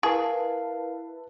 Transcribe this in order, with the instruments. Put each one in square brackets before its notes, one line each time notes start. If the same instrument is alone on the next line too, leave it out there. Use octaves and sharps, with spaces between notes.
[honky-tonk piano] E4 B4 A5 [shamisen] G#4 [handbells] A#4 F5